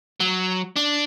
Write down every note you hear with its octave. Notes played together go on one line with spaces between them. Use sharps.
F#3
D4